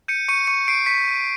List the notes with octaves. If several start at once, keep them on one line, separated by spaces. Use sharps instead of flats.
G6 C#7 D#7
C#6 C#7 D#7
C#6 C#7 D#7
C#6 C7 D7
C#6 B6 C#7